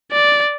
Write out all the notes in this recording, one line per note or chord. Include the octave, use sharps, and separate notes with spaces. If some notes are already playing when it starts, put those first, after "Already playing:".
D5